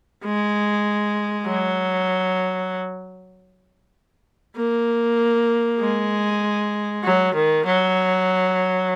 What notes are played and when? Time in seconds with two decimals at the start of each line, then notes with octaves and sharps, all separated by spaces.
0.24 G#3
1.47 F#3
4.56 A#3
5.80 G#3
7.04 F#3
7.34 D#3
7.66 F#3